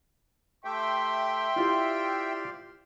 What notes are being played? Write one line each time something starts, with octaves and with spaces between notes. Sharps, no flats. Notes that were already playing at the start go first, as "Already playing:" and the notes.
A3 G4 E5 G5 C6
E4 F4 G4 C5 D5 F5